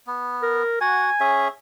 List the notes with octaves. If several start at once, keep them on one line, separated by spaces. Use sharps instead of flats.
B3
A#4
F#4 F#5 G#5
C#4 G#4 E5